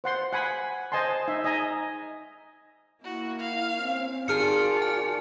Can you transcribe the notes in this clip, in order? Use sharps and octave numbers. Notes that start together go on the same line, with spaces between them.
C5 F#5 C6
F#5 G#5 B5
C5 D#5 G#5 A5 C6
D#4 E5
D#5 G#5 A#5
A#3 E4 F#4
F5
C4 C#4
D#3 F4 F#4 G#4 D5 A5 F6 C#7
G#5